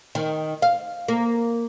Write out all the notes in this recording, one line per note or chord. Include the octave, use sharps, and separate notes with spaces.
D#3
F5
A#3